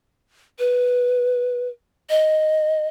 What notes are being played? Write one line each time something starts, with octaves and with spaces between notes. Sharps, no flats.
B4
D#5